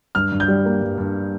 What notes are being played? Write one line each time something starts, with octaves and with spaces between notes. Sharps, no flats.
G2 F6
G2
G6
G3
A#3
G2
G2